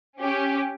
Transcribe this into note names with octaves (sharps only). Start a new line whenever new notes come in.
C#4 G4